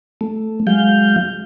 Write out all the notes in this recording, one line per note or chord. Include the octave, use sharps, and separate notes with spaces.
A3
F#3 G#3 F5 G6